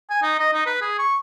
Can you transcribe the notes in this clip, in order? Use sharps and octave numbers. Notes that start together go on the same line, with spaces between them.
G#5
D#4
D#5
D#4
B4
G#4
C#6